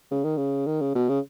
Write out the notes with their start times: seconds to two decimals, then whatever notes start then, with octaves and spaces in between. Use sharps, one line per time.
0.11 C#3
0.24 D#3
0.37 C#3
0.66 D#3
0.81 C#3
0.95 B2
1.09 C#3